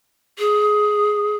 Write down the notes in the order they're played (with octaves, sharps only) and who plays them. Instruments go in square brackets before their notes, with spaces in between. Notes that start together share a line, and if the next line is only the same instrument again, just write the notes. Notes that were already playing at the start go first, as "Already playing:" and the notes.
[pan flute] G#4